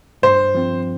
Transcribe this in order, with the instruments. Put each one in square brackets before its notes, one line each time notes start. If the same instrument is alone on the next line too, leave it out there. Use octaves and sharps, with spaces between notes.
[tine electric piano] G2 [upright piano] C5
[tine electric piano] F3 C4